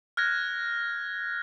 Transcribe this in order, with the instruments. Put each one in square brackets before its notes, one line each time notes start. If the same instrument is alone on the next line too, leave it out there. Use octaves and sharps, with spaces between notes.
[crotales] F6 F#6 G#6 A#6